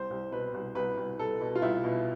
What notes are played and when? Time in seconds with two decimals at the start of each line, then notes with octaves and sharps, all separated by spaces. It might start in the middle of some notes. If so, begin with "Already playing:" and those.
Already playing: C2 C5
0.10 C2
0.32 B2 B4
0.54 C2
0.75 C2 B4
0.97 C2
1.19 C2 A4
1.41 B2
1.55 F4
1.62 C2 E4
1.84 B2